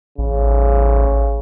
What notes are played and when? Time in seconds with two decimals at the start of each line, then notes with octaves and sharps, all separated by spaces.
0.18 A1 C#3